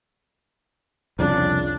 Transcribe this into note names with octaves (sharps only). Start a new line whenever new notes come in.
C2 F2 C#3 D4